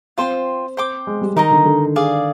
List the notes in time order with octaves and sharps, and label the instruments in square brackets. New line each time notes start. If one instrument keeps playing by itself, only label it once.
[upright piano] C4 [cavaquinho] F4 C5 G5 C6
[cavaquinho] C5 G5 D6
[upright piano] G#3
G3
[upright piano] D#3 [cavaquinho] D#4 A#4 D#5 A#5
[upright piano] D3
D3
[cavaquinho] G#4 D5 F5